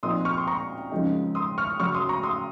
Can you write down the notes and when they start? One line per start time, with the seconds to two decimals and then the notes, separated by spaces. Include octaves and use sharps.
0.03 A#2 F3 C4 D#4 C6 D#6
0.25 C#6 F6
0.37 C6
0.47 A#5 C#6
0.91 F#2 C#3 F3 G#3 D#4
1.35 C6 D#6
1.58 C#6 F6
1.80 F#2 C#3 F#3 C#6 F6
1.95 C6 D#6
2.09 A#5 C#6
2.23 C6 D#6